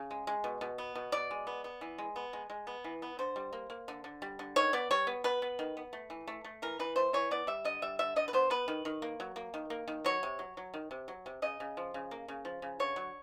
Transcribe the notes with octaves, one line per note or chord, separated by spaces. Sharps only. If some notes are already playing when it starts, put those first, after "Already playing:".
Already playing: C#3
G#3
G#3
B2
B2
B3
B2
B2 D5
G#3
B3
B3
E3
G#3
B3
G#3
G#3
B3
E3
B3
D3 C5
G3
A#3
A#3
D3
D3
G3
D3
D#3 C#5
B3 D5
G3 C#5
B3
B3 B4
B3
D#3
B3
A3
E3
A3
A3
E3 A#4
E3 B4
A3 C5
E3 C#5
B3 D5
G3 E5
D3 D#5
G3 E5
D3 E5
D3 D#5
B4
B3 C5
B3 B4
D#3
D#3
A#3
F#3
A#3
D#3
A#3
D#3
F#3 C#5
C3
F#3
F#3
D#3
C3
F#3
C3
C#3 D#5
C#3
F3
C#3
A#3
C#3
F3
C#3
D3 C#5
F#3